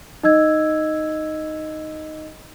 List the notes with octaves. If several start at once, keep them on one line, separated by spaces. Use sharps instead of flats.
D#4 D#5 E6 G#6